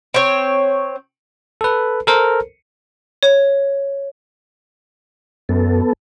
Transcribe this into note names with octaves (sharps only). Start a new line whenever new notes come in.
C4 C#5
A4 B4
A4 A#4 C5
C#5
F#2 B3 A4